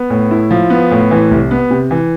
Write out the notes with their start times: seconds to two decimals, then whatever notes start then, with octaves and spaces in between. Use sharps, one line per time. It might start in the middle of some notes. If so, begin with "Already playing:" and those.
Already playing: B3
0.10 A2
0.31 E4
0.51 F3
0.70 B3
0.91 A2
1.11 E3
1.31 C2
1.51 B3
1.70 C3
1.91 E3